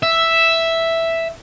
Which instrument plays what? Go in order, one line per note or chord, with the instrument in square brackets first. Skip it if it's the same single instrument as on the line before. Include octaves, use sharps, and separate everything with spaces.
[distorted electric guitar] E5